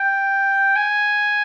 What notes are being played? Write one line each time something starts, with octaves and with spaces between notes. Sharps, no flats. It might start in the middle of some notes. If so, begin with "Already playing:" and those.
Already playing: G5
G#5